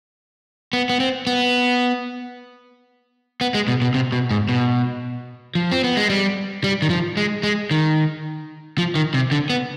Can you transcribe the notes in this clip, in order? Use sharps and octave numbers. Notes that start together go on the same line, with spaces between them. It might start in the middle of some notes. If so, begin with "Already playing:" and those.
B3
B3
C4
B3
B3
G#3
B2
B2
C3
B2
G#2
B2
F3
C4
B3
G#3
G3
G3
D#3
F3
G#3
G#3
D#3
F3
D#3
C3
D3
B3